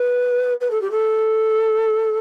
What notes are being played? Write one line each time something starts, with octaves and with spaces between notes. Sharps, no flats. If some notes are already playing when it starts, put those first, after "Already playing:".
Already playing: B4
B4
A4
G4
A4